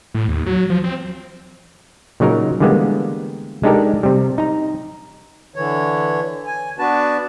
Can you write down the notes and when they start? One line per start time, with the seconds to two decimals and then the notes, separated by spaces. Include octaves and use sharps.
0.14 A2
0.28 D#2
0.46 F#3
0.70 F3
0.84 C4
2.20 A#2 C#3 F#3 D#4 A#4
2.60 D3 E3 G3 G#3 A#3 B3
3.64 G#3 D4 D#4 G4 A4 A#4
4.03 C3 G3
4.38 D#4 A#5
5.56 D3 E3 C#5
6.46 G#5
6.79 B3 D4 F#4 B4 A5